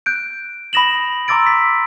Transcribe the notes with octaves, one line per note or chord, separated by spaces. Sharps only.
F#6 G6 D7
B5 D#6 A#6 E7 F#7
A#5 C6 D6 E6 A6 D7
B6